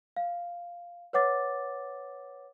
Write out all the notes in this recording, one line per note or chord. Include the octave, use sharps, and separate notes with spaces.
F5
B4 C#5 F#5 D6 A6